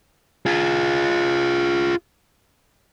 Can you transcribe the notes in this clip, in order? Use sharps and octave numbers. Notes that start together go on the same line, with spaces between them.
F4 G#4